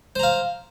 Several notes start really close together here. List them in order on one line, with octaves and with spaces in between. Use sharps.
C5 A#5 F5